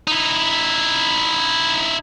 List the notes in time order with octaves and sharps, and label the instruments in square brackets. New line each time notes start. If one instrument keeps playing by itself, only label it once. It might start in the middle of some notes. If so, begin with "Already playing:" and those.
[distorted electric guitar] D#4 E4